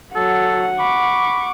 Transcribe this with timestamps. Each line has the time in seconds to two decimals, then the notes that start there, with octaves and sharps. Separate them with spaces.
0.16 F#3 A4 F#5
0.80 B5 C#6 D6